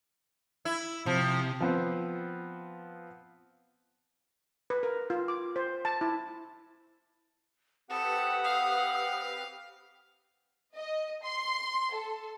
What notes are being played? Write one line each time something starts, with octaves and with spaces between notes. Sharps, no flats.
E4
C3 F3
F3 B3 C4
B4
A#4
F4
D6
C5
A5
E4
C4 G4 A4 B4 F#5 D#6
F5
D#5
C6
A4